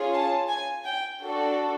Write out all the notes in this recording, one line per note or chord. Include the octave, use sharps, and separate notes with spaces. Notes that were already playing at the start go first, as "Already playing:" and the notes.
Already playing: C#4 F4 G#4
A5
G#5
G5
D4 F#4 A4